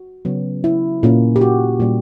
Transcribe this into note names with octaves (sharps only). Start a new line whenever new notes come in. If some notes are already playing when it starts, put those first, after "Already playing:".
Already playing: F#4
C#3 F#3 B3
E4
A#2 A#3 C#4
G4
F#4
A#2 G3 C#4